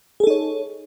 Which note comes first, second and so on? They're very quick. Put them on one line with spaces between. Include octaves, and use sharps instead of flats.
G#4 A4 D#4 C#5